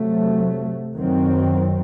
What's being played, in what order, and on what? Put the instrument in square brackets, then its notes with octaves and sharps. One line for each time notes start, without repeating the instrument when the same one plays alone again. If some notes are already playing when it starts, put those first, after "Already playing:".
Already playing: [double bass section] C3 F#3 A3
F#2 D#3 F#3 C4